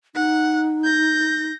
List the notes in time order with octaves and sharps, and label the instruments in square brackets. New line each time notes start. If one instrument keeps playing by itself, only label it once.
[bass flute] D#4 [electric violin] F#5
[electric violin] G6 A#6